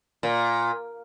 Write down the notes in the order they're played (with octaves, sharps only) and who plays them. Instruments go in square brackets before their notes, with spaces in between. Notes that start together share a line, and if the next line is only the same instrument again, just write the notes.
[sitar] A#2